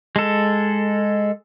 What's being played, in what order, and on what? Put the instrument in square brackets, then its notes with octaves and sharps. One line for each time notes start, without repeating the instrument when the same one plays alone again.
[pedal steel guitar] G#3 A4